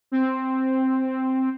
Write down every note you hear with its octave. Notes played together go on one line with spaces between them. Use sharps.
C4